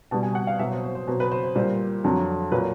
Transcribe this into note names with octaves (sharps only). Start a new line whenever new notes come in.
B2 G3 A5
G#5
F#5
F5
B2 F#3 E5
C5
C5
C5
B2 F#3 C5
B4
C5
C5
A#2 G3 C5
F2 D3 F#3
A#2 F#3 B4